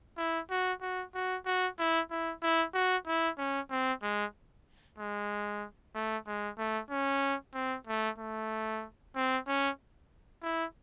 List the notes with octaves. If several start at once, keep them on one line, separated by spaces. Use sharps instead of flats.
E4
F#4
F#4
F#4
F#4
E4
E4
E4
F#4
E4
C#4
C4
G#3
G#3
A3
G#3
A3
C#4
C4
A3
A3
C4
C#4
E4